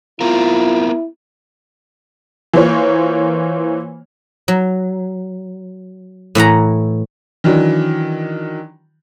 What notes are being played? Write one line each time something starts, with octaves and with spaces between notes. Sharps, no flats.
B3 C4 E4 F4 A#4
E3 A#3 F4 C5 C#5
F#3
A2 E3 F#5 A#5
D#3 E3 F#3 D4